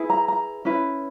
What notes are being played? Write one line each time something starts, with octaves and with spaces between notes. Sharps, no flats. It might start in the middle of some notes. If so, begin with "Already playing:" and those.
Already playing: E4 G#4 B4
A#5
A#5
C#4 E4 B4